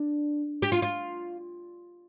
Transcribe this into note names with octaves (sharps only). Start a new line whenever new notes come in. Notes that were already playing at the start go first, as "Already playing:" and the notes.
Already playing: D4
G4
F4
F4